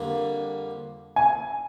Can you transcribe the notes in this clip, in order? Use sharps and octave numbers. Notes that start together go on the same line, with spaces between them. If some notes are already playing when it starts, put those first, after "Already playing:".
Already playing: F2 D3 G3 A#3 D4
G#5